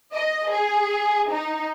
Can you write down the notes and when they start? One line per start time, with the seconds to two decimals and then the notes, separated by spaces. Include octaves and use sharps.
0.14 D#5
0.50 G#4
1.30 D#4